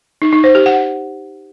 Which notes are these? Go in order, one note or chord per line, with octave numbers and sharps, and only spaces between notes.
D#4
D#4
C5
G4
F#5